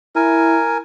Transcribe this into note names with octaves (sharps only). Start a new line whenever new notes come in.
E4 A#4 G#5